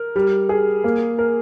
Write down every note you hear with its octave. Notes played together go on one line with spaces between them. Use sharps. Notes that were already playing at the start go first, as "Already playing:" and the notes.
Already playing: A#4
G3
G#4
A#3
A#4